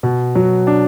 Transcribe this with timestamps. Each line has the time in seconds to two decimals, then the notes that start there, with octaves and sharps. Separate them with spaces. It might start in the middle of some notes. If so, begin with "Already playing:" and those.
0.03 B2
0.35 F#3
0.67 D4